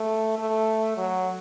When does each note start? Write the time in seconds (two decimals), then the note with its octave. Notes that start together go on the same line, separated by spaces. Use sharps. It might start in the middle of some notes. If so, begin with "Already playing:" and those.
Already playing: A3
0.38 A3
0.97 F#3